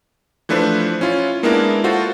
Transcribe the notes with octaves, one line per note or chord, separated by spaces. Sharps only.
E3 F3 A3 D4 B4 C5
C#4 E4 F4
G#3 A#3 B3 D4 E4 A#4
F4 F#4 A4 C5